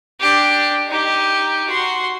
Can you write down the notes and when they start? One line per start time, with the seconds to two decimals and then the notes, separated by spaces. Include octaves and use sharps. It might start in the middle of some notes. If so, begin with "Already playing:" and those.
0.20 D4 G4
0.88 D#4 G4
1.67 F#4 C6